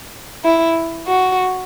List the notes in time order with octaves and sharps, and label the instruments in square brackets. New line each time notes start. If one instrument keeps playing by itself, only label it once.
[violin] E4
F#4